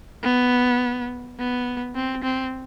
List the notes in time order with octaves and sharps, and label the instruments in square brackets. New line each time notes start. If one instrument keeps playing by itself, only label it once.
[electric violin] B3
B3
C4
C4